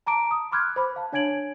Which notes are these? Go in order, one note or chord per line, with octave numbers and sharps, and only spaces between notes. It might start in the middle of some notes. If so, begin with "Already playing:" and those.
A5 A#5 D6 D7
D#6
B5 C6 D6 F6 F#6 G#6
C5 B5 D6
F5 A5
D4 C#5 G#5 G#6 D7 F#7